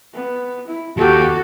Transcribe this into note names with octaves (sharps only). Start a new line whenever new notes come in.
B3
E4
D#2 F#4 G4 A4